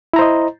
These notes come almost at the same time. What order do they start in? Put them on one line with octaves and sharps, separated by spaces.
E4 A#5 C5 D#5